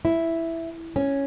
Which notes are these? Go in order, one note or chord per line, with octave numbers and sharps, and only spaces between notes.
E4
C#4